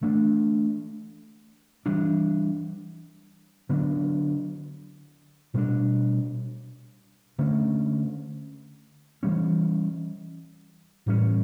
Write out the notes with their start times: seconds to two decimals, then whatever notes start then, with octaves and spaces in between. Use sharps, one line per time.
0.01 E3 A3 D4
1.86 E3 G3 D4
3.69 D3 F#3 B3 D4
5.54 B2 G3 B3 D4
7.38 D3 A3 C#4
9.23 E3 G3 C#4
11.06 A2 E3 G3 C#4